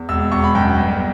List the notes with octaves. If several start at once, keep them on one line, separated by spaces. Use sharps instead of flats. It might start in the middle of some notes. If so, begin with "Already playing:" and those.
Already playing: E2
E1 E6
E1 C#6
B5
F#2 G5
G1